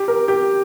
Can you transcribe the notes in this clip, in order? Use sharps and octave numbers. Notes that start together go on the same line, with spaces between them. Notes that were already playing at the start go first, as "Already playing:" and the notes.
Already playing: G4
A#4
G4